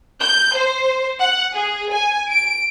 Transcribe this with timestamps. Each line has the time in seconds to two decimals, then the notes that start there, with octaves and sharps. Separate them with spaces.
0.20 G6
0.57 C5
1.19 F#5
1.53 G#4
1.92 G#5
2.31 D7